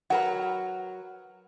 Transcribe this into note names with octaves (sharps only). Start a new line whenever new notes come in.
F#3 A#4 B4 F#5